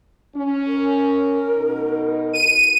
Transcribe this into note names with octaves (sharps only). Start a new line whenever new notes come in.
C#4
A#4
B2 D#4
D#7